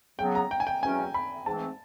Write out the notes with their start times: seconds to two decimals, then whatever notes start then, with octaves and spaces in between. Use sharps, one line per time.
0.19 C#3 F#3 B3 G5
0.35 A#5
0.51 G5
0.60 G#5
0.67 G5
0.82 E2 B2 F#3 A3 C#4 G#5
1.14 B5
1.46 G#2 E3 A3 C4 A5